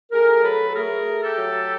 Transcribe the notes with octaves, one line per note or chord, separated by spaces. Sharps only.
A3 G#4 A#4
F#3 A4 B4
A4
A3 G#4 A#4
A3
G4 A4
F#3